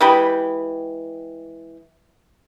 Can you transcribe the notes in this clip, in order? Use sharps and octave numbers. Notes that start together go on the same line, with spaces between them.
E3 G#3 G4 B5